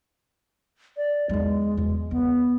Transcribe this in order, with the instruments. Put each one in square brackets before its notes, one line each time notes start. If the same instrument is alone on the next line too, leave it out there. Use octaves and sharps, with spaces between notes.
[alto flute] D5
[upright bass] E2 D#4 [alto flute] G#3
[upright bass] E2
[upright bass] D#3 [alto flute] B3